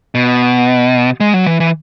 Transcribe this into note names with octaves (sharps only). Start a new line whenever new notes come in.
B2
G#3
F#3
E3
E3